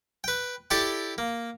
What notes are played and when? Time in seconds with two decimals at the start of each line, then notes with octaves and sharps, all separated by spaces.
0.24 B4 G5
0.71 E4 G4 A4 D5 G5 A5
1.18 A#3